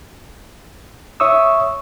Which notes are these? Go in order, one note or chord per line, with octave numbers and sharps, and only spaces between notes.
C#5 E5 C#6 D#6 E6